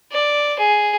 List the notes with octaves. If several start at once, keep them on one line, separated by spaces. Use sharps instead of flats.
D5
G#4